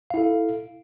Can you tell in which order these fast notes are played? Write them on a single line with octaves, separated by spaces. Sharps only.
F5 E4 A4